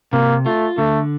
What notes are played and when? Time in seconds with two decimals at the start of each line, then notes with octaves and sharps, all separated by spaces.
0.13 C3 A#3
0.45 A3 F4
0.78 D3 A3